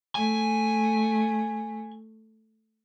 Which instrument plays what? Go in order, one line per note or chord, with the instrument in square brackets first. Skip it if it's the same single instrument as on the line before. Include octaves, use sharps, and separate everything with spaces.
[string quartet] A3 [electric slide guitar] G#5